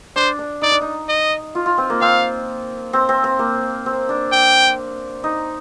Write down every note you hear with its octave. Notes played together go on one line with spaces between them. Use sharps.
D4 C5
D4
D#4 D5
D4
D#4
D#5
F4
F4
C4
A#3
C4 F5
C4
C4
C4
A#3
C4
D4
G5
D#4